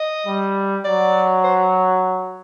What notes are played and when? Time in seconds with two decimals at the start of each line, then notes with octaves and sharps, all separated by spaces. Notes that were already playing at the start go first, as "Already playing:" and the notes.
Already playing: D#5
0.27 G3
0.85 F#3 D5
1.44 C5